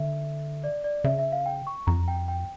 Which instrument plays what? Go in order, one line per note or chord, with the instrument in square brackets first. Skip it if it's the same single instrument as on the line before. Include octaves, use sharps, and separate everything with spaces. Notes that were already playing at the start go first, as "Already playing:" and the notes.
Already playing: [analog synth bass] D3 [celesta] E5
[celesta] D5
D5
[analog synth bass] C#3 [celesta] E5
[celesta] E5
F5
G5
C#6
[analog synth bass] F2 [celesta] A#5
[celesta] G5
G5